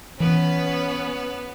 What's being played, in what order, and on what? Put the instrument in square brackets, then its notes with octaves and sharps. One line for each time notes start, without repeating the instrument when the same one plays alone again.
[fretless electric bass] E3 [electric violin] B3 [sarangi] C#4 [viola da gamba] B4